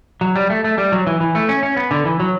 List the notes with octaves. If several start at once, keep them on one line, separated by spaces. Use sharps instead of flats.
F#3
G3
A3
A3
G3
F#3
E3
E3
A3
C#4
C#4
B3
D3
E3
F#3